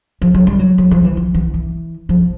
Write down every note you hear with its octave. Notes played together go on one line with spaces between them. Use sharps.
F3
F#3
G3
F#3
F#3
F3
E3
F3
E3
E3
F3